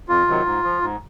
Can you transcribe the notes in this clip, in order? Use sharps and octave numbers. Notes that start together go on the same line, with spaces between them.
F2 F4
C3 D#3 F#3
G#2
F3
G#2